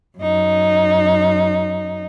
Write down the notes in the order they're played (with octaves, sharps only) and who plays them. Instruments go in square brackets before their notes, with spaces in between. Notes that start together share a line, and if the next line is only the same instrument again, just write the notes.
[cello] F#2 D#4